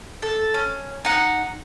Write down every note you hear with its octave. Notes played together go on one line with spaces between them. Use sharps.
A4
C#4
D#4 F#5